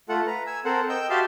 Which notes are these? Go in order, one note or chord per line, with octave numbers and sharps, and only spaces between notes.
A3 F4 A4 F#5
B4 A#5
G#5 E6
C4 A4 A#4 C5 F#5
D#5 G5 E6 G6
F#4 G4 E5 F5 A5 C6